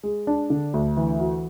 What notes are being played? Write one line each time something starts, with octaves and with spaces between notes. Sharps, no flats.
G#3
D4
D3
D2
E3
F#4